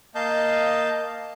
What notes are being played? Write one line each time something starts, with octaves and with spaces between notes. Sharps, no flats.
A#3 D#5 F5 A5 G6